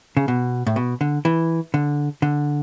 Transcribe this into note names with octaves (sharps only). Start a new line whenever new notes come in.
C#3
B2
A2
B2
D3
E3
D3
D3